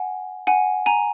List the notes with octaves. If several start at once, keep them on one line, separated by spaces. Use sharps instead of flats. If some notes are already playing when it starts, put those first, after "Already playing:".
Already playing: F#5 G#5
F#5 G#5
G#5 A#5